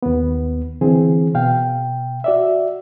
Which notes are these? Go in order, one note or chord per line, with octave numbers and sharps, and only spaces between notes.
D#2 B3
D3 E3 C4 G#4
B2 F5 G5
F#4 D5 E5